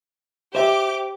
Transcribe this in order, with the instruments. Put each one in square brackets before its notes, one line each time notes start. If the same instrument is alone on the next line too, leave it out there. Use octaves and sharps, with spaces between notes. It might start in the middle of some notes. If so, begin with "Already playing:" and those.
[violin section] G4 D6 [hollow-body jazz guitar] C5 E5